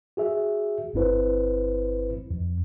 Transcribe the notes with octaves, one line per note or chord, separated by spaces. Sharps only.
F#4 G#4 E5
G1 G2 C4 E4 B4 C5
F2